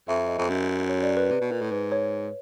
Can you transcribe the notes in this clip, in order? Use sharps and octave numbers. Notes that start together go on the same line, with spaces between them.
F2 E5
D#5
F2
F#2
C#5
D5
B4
C3 B4
B2
A#2
A2
G#2 B4
C#5